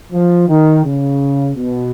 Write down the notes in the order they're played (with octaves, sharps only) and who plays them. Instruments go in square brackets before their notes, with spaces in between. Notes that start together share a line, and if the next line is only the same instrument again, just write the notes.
[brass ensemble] F3
D#3
C#3
B2